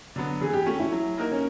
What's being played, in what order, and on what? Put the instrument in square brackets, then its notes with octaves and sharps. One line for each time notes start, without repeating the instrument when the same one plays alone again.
[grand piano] D3 F#3 B3
[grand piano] E3 [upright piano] G#4
[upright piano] G4
[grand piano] A3 C#4 [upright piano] F#4
[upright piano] E4
[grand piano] F#3
A#3 D#4 F#4 A#4
[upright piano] C#4